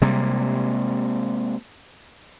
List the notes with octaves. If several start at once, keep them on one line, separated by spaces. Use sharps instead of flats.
C3 G3 G#3 A#3